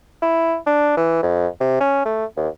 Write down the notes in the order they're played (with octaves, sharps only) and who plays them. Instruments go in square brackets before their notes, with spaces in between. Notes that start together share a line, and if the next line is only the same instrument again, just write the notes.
[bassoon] E4
D4
E3
F2
C3
C#4
A3
D#2